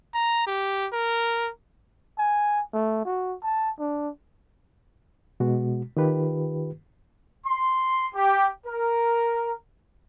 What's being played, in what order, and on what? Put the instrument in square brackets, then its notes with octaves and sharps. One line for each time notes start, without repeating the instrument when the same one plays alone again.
[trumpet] A#5
G4
A#4
[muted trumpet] G#5
A3
F#4
A5
D4
[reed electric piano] B2 G#3 F#4
D#3 F4 G4 B4
[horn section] C6
G4
A#4